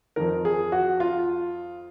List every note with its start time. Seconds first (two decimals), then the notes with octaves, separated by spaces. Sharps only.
0.16 F2 D#3 A#4
0.45 G#4
0.72 F#4
1.00 F4